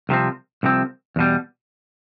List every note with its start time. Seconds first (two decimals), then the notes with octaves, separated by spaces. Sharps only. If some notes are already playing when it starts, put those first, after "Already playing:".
0.09 C2 C3 F3 C4
0.63 C2 C3 F3 C4
1.16 E2 B2 G3